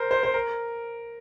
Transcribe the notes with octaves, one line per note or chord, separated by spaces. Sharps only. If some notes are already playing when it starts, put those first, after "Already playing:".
Already playing: A#4 C5
C5
C5
A#4